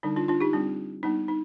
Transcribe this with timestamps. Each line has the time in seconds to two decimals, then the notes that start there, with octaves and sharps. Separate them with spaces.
0.03 D3 G3 D4 D#4
0.16 D4 F4
0.28 D4 F4
0.40 D#4 G4
0.53 G3 C4 D4
1.03 G3 B3 D4 D#4
1.28 D#4